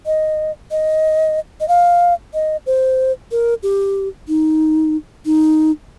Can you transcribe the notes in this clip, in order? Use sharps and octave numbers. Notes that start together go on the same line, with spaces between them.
D#5
D#5
D#5
F5
D#5
C5
A#4
G4
D#4
D#4